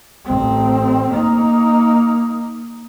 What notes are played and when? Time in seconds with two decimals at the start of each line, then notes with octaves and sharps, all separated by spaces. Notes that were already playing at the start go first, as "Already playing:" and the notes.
0.25 A1 C4
1.12 A#3 D#4